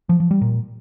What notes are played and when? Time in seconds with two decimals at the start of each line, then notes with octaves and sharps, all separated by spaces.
0.09 F3
0.20 F3
0.31 G3
0.41 A#2